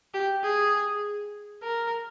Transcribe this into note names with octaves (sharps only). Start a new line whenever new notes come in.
G4
G#4
A#4